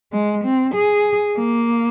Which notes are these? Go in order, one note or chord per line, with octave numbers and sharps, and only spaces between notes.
G#3
C4
G#4
A#3